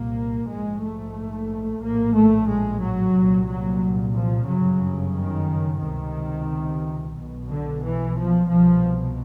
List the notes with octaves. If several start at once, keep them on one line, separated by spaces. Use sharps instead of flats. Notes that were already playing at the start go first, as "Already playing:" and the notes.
Already playing: C2 A#2 A#3
A#1 G#2 G#3
A3
A#1 A2 A#3
A3
G#3
F#3
C2 A#2
F#3
F3
G1 F#2 C#3 F#3
D#3
C#2 C3 D#3
B1 B2
D3
E3
F3
C2 B2 F3